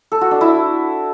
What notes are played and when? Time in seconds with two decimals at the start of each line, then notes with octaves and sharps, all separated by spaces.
0.12 A4
0.21 F#4
0.31 D4
0.41 E4